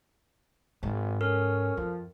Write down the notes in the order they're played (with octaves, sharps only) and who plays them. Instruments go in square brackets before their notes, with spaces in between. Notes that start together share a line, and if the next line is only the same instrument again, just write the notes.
[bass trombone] G#1 [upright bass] G#2
[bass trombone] C#4 [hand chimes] A4 A#4 F6
[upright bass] F2 [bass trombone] F3